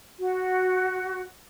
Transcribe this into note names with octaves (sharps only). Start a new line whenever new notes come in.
F#4